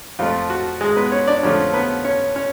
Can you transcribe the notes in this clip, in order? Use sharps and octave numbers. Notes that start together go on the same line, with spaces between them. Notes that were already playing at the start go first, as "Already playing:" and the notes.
F2 F3 A3 F4
F#4
G#3 G#4
B3 B4
C#4 C#5
D4 D5
F2 D3 F3 A3 C#4 C#5
B3 B4
C#4 C#5
C#4 C#5